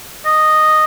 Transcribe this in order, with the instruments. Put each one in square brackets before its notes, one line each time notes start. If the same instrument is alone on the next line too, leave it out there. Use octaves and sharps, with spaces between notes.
[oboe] D#5